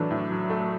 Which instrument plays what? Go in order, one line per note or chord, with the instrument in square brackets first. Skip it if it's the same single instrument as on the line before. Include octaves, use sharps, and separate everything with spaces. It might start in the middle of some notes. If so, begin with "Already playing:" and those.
Already playing: [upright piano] A2 F#3 A3 D4 [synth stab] E3
[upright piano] A2
F#3
A3